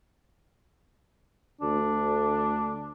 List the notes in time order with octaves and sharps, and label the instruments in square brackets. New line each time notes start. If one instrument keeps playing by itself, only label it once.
[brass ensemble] D2 [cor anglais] D4